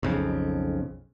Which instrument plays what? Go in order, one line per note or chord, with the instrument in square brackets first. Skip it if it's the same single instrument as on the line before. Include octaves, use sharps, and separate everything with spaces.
[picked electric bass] B1 F2 C#3